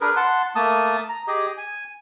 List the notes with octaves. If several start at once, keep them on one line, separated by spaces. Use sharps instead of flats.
D4 G#4 A#4 B4
F#5 A5 C6
A3 A#3 A5 D#6
A#5
G4 G#4 D#5
G#5